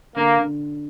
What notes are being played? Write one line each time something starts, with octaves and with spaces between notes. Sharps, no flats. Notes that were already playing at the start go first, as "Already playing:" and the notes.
D3 A#3
D3